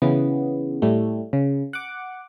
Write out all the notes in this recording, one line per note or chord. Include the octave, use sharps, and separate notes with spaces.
C#3 E3 B3
A2 G3 A3
C#3
F#5 D6